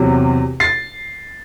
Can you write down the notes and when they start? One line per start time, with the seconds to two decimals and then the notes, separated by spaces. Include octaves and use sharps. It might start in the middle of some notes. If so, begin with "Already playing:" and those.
Already playing: E2 C3 F#3
0.60 A6 C7